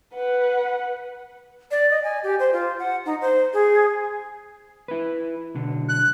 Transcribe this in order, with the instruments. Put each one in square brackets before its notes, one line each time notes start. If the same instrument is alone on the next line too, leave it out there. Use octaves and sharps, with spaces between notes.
[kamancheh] B4 F#5
[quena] D5
D#5
G#5
G4
C5
F4
F#5
D#4
C5
G#4
[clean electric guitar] E4 B4
B1 D3
[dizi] F#6